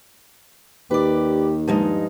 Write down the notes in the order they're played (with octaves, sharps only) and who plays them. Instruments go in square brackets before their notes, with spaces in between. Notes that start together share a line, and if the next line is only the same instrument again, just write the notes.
[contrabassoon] D#2 [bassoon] G4 [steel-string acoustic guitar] B4 D5
[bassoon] G2 [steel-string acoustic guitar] F3 G#3 D#4